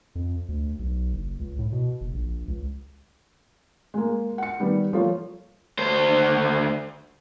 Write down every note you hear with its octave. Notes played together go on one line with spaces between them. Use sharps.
F2
D2
B1
F#1
C#2
A2
B2
F#1
A#1
C#2
G#3 A#3
F#5 C#7
D#3 G3 B3
F3 G3 A3 A#3 F4 C#5
D2 C5